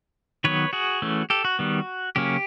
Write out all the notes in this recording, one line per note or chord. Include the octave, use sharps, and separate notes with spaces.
D#3 F#3 B3 B4 C#5
F#4 G#4
E3 A3 C#4
G4 A4
F#4
D#3 G3 B3
C#3 F#3 A#3 C#4 G4